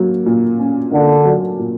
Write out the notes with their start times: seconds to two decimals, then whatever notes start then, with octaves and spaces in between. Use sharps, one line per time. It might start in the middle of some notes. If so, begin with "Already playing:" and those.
Already playing: F#3 A#3
0.26 A#2
0.59 C#4
0.92 D3 A#3
1.25 F#3
1.59 A#2